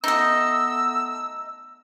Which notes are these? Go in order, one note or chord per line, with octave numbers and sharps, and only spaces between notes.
A3 B3 D#4 D#5 E6